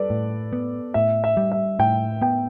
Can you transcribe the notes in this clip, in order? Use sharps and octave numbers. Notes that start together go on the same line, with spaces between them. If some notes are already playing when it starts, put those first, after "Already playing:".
Already playing: G3 A4 B4 D5
A2
B3
A2 E5
E5
G3
E5
A2 G5
B3 G5